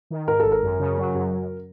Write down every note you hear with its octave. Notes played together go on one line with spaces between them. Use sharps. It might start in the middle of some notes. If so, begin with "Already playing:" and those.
D#3
G#2 A#4
A4
G#1
A#4
F#2
C#3
F#3
F#2
F#2